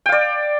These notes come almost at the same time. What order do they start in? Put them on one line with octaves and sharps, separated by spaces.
G5 F5 D5